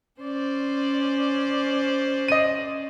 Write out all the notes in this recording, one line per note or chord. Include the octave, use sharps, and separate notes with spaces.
C#4 C5 D5
D#5 D#7